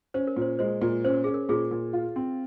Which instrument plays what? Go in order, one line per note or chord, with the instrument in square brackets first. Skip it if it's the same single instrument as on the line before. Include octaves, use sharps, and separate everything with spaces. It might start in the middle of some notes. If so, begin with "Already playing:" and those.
[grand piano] C#4 [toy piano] C5
[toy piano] A#4
[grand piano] A#2
[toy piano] C5
[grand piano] G#3 [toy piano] C5
[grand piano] A#2
[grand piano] C#4 [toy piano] C5
[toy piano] A#4
[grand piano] C#4 [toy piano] G#4
[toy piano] A#4
[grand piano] A#2 [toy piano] G#4
[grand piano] A#2
F4
C4